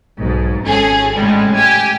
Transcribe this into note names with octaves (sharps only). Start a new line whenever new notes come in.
B1 G#2
G#1 C#4 G#4 A4
A2 C#3 G3 G#3
G4 G#5